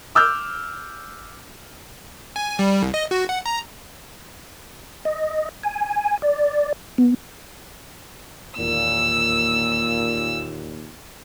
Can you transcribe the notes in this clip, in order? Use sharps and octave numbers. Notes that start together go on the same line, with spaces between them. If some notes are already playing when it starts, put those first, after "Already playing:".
D6 E6 F6 G6
G#5
G3
C2
D#5
F#4
F#5
A#5
D#5
G#5
D5
B3
E1 D#2 A#2 E6